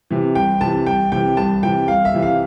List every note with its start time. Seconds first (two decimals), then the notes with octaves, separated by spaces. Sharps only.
0.11 C3 E3
0.35 C2 G5
0.61 C3 E3 A5
0.86 C2 G5
1.12 C3 E3 G5
1.37 C2 A5
1.63 C3 E3 G5
1.88 C2 F5
2.05 E5
2.14 C3 E3
2.23 F5